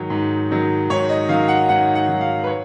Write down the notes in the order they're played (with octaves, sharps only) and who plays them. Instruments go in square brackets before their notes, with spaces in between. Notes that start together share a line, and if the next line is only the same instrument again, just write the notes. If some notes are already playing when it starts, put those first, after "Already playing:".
Already playing: [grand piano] G#2 D#3 F#3 C#5
G#2
D#3 F#3
G#2 C#5
D#5
D#3 F5
F#3
F#5
G#2 F#5
F#5
D#3 F#3
F5
B4
C#5